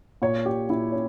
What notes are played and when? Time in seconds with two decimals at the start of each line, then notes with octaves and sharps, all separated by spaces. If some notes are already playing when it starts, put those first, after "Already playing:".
0.22 A#2 C#5
0.46 G4
0.69 A#2 E4
0.92 C#4